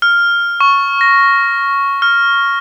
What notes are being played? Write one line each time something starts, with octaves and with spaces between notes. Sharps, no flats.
F6
C#6
A#6
F6